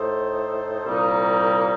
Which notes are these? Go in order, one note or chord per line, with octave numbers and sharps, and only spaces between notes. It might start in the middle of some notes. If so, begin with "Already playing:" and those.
Already playing: A2 A3 D#4 A4 C5
C2 A#2 G3 A#3 D#4